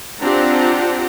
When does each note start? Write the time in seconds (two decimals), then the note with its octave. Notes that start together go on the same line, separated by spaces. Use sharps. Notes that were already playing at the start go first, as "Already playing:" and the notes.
0.21 C4 D4 F4 G4 F#5 A#5